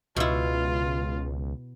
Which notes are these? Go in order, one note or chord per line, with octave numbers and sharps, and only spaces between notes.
C#2 B2 E4 F4